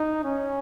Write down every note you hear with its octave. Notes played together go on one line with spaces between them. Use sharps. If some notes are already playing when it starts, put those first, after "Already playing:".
Already playing: D#4
C#4